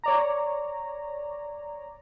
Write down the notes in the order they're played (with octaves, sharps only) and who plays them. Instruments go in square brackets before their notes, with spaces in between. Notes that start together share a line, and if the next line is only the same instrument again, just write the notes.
[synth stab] C#5 D5 A#5